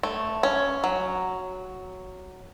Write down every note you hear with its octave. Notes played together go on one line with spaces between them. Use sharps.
A3
C#4
F#3